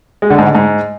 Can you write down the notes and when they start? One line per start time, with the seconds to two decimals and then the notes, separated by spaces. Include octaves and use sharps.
0.22 G#3
0.30 D3
0.38 G#2
0.47 D3
0.55 G#2